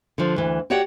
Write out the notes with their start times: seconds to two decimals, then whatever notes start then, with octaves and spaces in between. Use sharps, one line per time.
0.18 D3 F3
0.36 D2 E3
0.70 F#4 G4 C#5 D5 F#5 G5